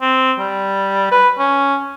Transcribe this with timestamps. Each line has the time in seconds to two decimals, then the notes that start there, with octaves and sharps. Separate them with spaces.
0.01 C4
0.39 G3
1.11 B4
1.38 C#4